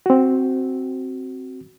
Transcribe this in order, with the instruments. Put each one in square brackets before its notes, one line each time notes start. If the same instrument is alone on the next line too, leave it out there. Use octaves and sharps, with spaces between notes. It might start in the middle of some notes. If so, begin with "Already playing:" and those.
[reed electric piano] C4 F#4